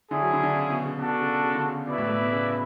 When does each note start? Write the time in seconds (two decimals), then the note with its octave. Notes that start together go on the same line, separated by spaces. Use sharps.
0.11 D3 C#4 E4 G#4
0.21 F#3
0.33 D3
0.43 D3
0.55 C#3
0.70 B2
0.85 C#3
0.98 B2 D4 F#4 A4
1.21 C#3
1.43 C#3
1.55 D3
1.66 C#3
1.87 B2 E4 B4 D5
1.98 A2
2.09 A2
2.21 B2
2.32 C#3